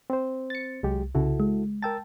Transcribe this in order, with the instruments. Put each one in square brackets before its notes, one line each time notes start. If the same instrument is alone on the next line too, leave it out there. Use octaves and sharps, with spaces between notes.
[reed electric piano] C4 C5
[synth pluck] A6 C#7
[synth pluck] C2 [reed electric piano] F#3 G#3 G4
[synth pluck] C2 C#3 [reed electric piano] E4 F#4 A4
[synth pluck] G#3
[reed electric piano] A#4 E6 A6 [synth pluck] G5 A5